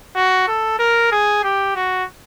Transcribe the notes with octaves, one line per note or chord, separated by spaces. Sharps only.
F#4
A4
A#4
G#4
G4
F#4